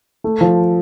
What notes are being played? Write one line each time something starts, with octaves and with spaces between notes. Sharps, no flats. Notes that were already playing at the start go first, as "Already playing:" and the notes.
A3
F3